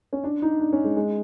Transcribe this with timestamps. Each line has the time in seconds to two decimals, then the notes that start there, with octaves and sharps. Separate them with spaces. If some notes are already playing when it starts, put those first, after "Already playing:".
0.13 C#4
0.24 D4
0.42 D#4
0.59 D4
0.73 C#4
0.84 G#3
0.96 G#3